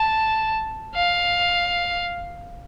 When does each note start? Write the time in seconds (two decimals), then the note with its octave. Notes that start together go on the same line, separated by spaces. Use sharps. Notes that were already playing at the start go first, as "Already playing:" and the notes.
Already playing: A5
0.96 F5